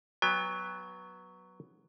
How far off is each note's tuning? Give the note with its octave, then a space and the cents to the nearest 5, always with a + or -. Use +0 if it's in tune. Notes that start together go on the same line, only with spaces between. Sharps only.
F#3 +0 B3 +0 G5 +45